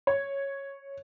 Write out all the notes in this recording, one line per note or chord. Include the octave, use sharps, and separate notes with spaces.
C#5